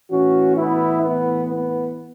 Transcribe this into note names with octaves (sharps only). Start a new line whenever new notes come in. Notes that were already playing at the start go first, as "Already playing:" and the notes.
A2 E3 C#4 F#4
B3 E4
B3
B3